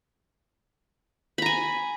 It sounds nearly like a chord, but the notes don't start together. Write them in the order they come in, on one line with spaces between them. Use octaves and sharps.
B5 A#5 G#5